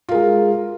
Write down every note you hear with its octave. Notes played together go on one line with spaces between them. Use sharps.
G#3 F4 A#4